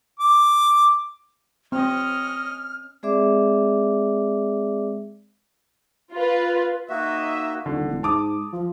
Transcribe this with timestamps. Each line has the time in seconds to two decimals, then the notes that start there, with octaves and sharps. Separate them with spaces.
0.20 D6
1.72 C4 C#4 D#5 F6
3.03 G#3 C4 G#4 D5 E5 D6
6.13 F4 B4
6.90 A#3 D#4 F#4 D#5 E5
7.66 D#1 D3
7.88 E1
8.03 G#2 A5 D6 D#6
8.53 F3